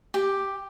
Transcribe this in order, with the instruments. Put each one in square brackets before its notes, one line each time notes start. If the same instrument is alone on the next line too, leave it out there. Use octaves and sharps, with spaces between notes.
[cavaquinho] G4